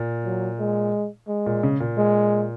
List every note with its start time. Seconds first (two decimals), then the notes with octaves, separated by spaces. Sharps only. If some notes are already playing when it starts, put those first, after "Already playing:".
Already playing: A#2
0.25 F#3
0.59 G#3
1.28 G#3
1.46 A#2
1.63 C#3
1.80 A#2
1.98 G#3